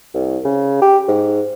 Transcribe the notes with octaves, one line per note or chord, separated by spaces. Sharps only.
C2
C#3
G4
G#2